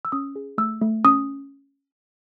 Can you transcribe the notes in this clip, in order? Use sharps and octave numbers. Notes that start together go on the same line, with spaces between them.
E6
C#4 D#6
G#4
A3 E6
A3
C#4 D#6